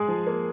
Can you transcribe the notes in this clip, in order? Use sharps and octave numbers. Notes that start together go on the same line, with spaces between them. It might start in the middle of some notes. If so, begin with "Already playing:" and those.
Already playing: G#3 G#4
F3
A#3